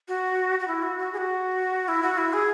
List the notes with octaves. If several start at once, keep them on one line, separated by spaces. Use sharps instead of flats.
F#4
F#4
E4
F#4
F#4
G#4
F#4
E4
F#4
E4
G#4